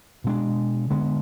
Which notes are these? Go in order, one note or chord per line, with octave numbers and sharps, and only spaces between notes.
B2 G#3 B3 D4
D3 G#3 B3